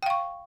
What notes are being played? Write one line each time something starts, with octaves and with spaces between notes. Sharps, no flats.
F5 G5 C#6